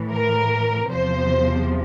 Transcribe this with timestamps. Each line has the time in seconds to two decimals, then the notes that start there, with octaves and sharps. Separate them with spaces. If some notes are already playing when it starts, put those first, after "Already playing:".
Already playing: A2 E3
0.12 A#4
0.91 E2 C3 F3 C5